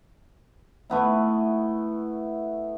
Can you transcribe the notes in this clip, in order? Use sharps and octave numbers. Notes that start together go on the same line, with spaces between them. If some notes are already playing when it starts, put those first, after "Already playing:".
A3 B3 E4